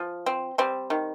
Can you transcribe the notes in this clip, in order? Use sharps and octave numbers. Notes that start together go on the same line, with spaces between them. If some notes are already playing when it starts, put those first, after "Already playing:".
Already playing: F3
C4
G3 C4
D#3